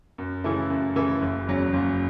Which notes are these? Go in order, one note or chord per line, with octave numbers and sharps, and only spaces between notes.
F#2
C#3 E3 A3 E4
F#2
C#3 E3 A3 E4
F#1
E2 C#3 F#3 C#4
F#1